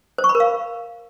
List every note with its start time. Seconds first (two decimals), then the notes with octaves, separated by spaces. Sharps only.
0.18 C5
0.24 C#6
0.29 B5
0.35 A#4
0.40 F5